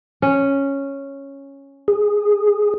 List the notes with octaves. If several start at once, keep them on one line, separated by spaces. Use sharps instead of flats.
C#4
G#4